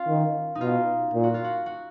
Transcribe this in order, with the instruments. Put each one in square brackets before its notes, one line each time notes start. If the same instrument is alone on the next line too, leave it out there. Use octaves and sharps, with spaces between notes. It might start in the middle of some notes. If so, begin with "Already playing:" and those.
Already playing: [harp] C#4 F4
[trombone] D#3
[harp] D#4
[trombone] B2 [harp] F4
[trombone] A#2
[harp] F#4
F4
F#4
F#4